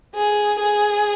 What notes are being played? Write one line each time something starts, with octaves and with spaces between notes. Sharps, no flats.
G#4
G#4